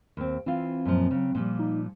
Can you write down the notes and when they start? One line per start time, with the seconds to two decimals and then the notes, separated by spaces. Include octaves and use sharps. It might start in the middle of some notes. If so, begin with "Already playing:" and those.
0.17 D#2 C4
0.46 E3 C4 F4
0.85 F#2 A#2 F3
1.11 C#3 F#3
1.35 A#2 F3 G3
1.59 D#4